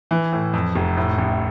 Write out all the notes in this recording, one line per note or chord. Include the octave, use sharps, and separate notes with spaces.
E3
A2
F2
F1
A2
A1